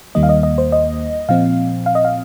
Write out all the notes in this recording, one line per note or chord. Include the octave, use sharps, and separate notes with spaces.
D#2 D#3 G3 A#3 D#5
F5
D#5
D#5
C5
D#5
A#2 F3 C4 F5
F5
D#5
F5